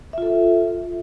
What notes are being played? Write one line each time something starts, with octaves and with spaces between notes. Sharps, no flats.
F4 A4 E5